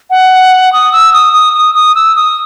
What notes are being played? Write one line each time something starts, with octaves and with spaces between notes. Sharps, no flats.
F#5
D#6
E6
D#6
D#6
D#6
D#6
E6
D#6